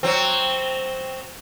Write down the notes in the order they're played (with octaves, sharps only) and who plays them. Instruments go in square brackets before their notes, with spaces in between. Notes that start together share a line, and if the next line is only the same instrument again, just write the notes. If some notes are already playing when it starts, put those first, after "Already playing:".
[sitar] F#3 C4